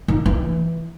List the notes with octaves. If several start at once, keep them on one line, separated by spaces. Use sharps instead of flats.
D#3
E3